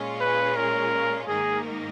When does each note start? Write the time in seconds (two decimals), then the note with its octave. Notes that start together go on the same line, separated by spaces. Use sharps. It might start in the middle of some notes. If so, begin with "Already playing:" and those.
Already playing: A#2 G#3 C#4 F4
0.21 B4
0.56 A#4
1.28 G#2 D#3 A#3 D#4 G#4 A#4